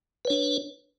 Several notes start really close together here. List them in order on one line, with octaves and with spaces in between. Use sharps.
B4 C#5 D4